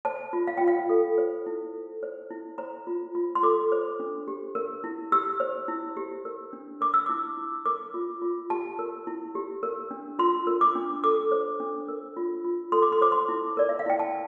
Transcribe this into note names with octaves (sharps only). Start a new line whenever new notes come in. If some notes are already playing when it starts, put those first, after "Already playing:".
C5 A5
F4
F5
F4 G5
F5
A4
C5
E4
A4
C5
E4
C5 A#5
F4
F4
C6
A4 D6
C5
D4
G4
A#4
E4
G4 E6
C5
E4
G4
A#4
D4
A#4 D6
E6
E4 D6
E4
A#4 D6
F4
F4
G4 A5
A#4
E4
G4
A#4
D4
F4 C6
A#4
D6
D4
A4 D6
C5
D4
A#4
F4
F4
A4 C6
D6
C6
C5 D6
C6
E4
A#4 D5
E5
F5
E4 G5
A5